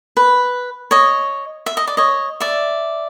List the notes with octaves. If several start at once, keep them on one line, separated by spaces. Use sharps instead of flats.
B4
C#5 D#5
E5
D#5
D5
C#5 D#5
D5 E5